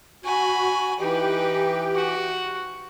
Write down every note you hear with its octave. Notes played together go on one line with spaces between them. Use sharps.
F#4 G#5 B5
E3 D#4 G4 B4 G5
F#4